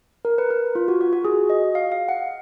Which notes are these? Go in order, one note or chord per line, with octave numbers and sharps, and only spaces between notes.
A#4
B4
A#4
F4
F#4
F#4
F#4
G#4
D#5
F5
F5
F#5